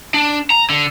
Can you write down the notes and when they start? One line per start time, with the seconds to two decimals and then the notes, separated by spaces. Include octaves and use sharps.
0.14 D4
0.50 A#5
0.70 D3